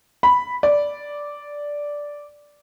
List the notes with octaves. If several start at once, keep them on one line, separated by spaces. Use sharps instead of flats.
B5
D5